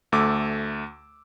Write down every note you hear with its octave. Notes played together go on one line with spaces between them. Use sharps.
D2 A3 D6 E6